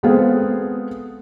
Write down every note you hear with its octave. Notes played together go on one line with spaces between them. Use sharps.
G#3 B3 C4 G#4 A4 F5